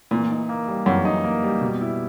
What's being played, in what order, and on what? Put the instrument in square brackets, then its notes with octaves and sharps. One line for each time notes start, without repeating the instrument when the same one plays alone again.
[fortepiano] A#2 [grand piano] E3
[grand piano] D#4
A#3
G3
[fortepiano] F#2 [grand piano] E3
[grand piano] D#4
A#3
G3
B2
E4